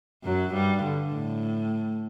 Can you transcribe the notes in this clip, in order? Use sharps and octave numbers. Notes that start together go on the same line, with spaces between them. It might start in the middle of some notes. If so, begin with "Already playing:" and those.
F#2 F#3
G2 G3
D3
A2